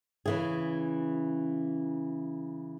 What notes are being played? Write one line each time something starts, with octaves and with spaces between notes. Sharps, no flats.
C#3 E3 G#4